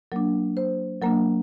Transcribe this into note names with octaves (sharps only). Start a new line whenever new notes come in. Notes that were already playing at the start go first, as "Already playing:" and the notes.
F#3 A#3 D4 A#4
C5
F#3 A#3 D4 A#4